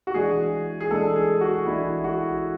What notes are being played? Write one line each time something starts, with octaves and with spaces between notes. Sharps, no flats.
F#4
E3 G#3 D4 G#4
G#4
E3 G#3 D4 A4
G#4
F#4
E3 G#3 D4 E4
F#4